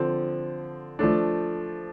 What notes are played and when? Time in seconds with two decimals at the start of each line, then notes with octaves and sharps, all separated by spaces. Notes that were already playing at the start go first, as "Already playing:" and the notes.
Already playing: D3 F3 C4
0.99 F3 A3 D4